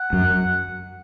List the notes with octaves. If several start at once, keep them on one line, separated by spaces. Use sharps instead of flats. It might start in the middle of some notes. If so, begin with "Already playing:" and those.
Already playing: F#5
F#2